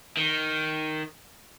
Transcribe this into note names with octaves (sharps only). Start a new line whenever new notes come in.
D#3